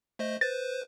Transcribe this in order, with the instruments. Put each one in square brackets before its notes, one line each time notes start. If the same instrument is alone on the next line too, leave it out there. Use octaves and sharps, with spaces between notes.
[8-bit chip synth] A3 C5 D#5
[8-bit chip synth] B4 C5 [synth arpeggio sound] A6